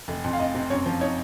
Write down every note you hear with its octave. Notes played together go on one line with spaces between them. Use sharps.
F1
F2
F5
F1 D#5
C3
F#2 C#5
F3
D#4 C#5